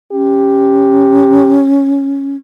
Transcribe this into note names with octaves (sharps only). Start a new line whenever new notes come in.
C#4 G4